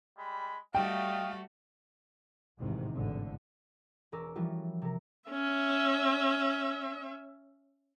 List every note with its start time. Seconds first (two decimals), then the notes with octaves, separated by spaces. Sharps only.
0.17 G3 G#3 B5
0.75 G3 A3 F#4 D#5 F5 G5
2.59 A1 E2 G#2 C3 D#3
2.95 G#1 E2 A2 D3
4.12 E1 C#4 A#4 D6 E6
4.35 E3 F3 G3 C#4 F4 F#4
4.82 C3 A#4
5.29 C#4 E5